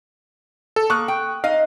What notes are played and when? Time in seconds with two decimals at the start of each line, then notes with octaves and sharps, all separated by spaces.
0.76 A4
0.90 A#3 C#6 D#6 F#6
1.08 G5
1.44 D#4 D#5 F5